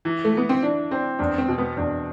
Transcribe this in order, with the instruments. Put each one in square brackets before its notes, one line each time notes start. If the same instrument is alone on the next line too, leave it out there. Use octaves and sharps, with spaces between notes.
[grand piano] E3
[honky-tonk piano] A3
[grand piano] E3 [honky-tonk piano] B3
[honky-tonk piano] C4
[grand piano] E3 [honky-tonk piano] D4
[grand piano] C4
[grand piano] E2 [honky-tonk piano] D4
[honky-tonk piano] C4
[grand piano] B2
[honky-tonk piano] B3
[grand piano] E2 [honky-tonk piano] D4